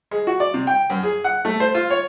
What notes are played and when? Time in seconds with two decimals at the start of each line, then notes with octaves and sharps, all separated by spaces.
0.11 G#3
0.27 F#4
0.40 D5
0.54 C3
0.67 G5
0.90 F#2
1.03 G#4
1.24 F#5
1.45 A3
1.60 C5
1.75 F4
1.90 C#5